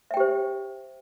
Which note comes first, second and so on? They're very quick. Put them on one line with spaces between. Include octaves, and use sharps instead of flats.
E5 G5 G4 C5